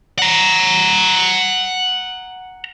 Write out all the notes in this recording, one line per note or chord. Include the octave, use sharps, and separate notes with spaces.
F#5 A#5